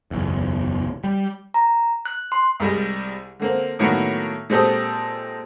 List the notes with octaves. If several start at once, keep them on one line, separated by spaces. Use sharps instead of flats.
F#1 B1 E2
G3
A#5
F#6
C6
C2 G3 G#3
D3 A#3 C4
A2 D#3 F#3 A#3 B3
A#2 G#3 C4 G4 A4 D#6